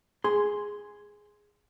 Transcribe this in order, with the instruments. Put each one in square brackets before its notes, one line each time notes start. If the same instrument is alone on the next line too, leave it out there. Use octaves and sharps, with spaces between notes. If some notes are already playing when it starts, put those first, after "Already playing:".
[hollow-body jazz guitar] G#4 C6